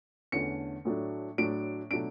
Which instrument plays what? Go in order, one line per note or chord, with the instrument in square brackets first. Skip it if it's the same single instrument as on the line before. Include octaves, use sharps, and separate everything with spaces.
[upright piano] E2 D3 A3 C#4 C#7
A2 F#3 A3 D4
A2 F#3 A3 D4 D7
B2 F#3 A3 D4 D7